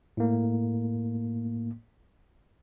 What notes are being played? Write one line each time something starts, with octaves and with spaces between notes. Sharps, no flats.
A2 A#3